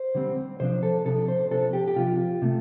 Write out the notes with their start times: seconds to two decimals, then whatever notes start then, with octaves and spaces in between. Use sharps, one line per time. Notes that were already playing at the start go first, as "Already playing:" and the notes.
Already playing: C5
0.15 D3 G3 C4
0.60 C3 F3 D4 C5
0.83 A4
1.05 C3 F3 D4 A4
1.28 C5
1.51 C3 F3 D4 A4
1.73 G4
1.88 G4
1.96 C3 F3 D4 F4
2.42 C3 A3